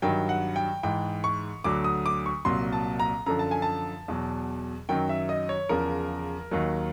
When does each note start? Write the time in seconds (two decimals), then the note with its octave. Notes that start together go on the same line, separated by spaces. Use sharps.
0.02 G2 D#3 F#3 G5
0.29 F#5
0.56 G5
0.83 G#2 E3 G5
1.24 C#6
1.64 D2 D3 F#3 D6
1.84 D#6
2.06 D6
2.26 C#6
2.45 C2 A#2 F#3 C6
2.72 A5
3.00 A#5
3.26 F#2 D3 F3 A#5
3.39 A5
3.51 G#5
3.62 A5
4.08 E2 B2 F#3
4.89 F#2 D#3 F#3 G5
5.09 E5
5.29 D#5
5.49 C#5
5.69 E2 C#3 F3 A#4
6.51 D#2 D#3 F#3